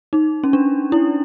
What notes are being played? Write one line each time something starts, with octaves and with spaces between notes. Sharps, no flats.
D#4
C#4
D4
E4